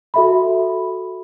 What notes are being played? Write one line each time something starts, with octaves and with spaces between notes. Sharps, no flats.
F#4 A4 E5 B5